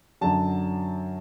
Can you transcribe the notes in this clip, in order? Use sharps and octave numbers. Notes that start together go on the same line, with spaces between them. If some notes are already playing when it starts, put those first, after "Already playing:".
F#2 D3 F#3 A5